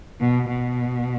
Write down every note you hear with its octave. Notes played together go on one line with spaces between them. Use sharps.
B2
B2